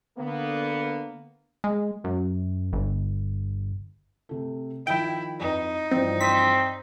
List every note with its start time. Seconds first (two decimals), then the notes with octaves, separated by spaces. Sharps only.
0.18 D3 A#3 B3
1.64 G#3
2.04 F#2
2.73 G1
4.29 C3 A3
4.87 D#3 F3 E4 G5
5.40 F2 D#4 B4
5.91 G2 E3 F3 C4
6.21 C4 B6